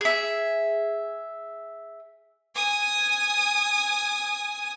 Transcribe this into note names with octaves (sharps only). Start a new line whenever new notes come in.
G#4 E5
G#5 D#6